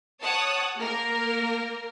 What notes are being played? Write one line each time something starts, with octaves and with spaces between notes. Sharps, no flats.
C#5 F#5 A5 D#6
A#3 A#4